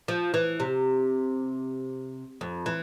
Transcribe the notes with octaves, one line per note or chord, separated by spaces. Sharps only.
F3
E3
C3
F2
E3